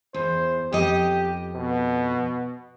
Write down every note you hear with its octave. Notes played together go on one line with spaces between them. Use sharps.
E2 C5
F2 G4 D#5
B2